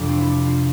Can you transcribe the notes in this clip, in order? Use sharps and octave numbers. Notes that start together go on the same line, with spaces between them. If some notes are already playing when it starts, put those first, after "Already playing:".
Already playing: F2 C3 F3 D4
C4
E4
D4
F4